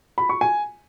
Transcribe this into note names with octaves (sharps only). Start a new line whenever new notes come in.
B5
C#6
G#5